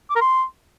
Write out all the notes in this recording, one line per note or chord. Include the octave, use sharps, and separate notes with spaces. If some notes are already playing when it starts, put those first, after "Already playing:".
D6
A#4
C6